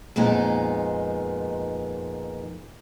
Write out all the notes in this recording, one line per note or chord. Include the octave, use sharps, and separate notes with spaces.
F2 A#2 G#3 B3 D#4